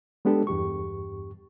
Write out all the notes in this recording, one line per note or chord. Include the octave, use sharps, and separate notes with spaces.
G#3 B3 D4 G4 A4
E2 G2 G4 C#6